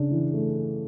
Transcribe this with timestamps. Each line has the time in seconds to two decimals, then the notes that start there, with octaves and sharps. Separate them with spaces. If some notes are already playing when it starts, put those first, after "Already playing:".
Already playing: C#3 D4
0.11 E3
0.33 A3